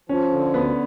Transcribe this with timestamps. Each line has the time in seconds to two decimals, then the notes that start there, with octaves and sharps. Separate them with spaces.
0.09 F3 C#4
0.31 D3
0.54 D2 B3